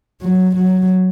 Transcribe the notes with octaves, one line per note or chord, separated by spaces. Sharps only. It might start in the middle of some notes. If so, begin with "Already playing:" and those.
F#3
F#3